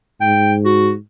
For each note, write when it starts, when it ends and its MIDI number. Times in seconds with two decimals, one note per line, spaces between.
0.21 0.96 44
0.21 0.54 79
0.65 0.91 66